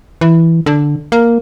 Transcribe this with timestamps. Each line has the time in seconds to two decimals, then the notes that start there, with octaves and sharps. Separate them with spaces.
0.21 E3
0.66 D3
1.12 A#3